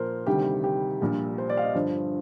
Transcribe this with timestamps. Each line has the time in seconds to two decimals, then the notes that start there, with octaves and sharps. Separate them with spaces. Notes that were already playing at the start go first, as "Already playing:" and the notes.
Already playing: A#2 F3 A#4 C5
0.26 D2 C3 D#3 G3 G4
0.64 G4
1.01 A#1 A#2 G3
1.38 C5
1.50 D5
1.57 F5
1.62 D#5
1.75 G1 G2 F3